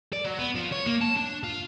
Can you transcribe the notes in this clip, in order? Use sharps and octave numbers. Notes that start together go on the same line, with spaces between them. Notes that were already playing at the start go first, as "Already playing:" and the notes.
D5
F#3
B3
F3
C#5
A#3
A5
D4
F4